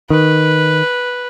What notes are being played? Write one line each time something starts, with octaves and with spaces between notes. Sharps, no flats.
D#3 B4